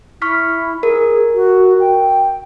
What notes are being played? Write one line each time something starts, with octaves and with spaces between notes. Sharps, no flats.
E4 C#6 F6 B6
G#4 A#4
F#4
G5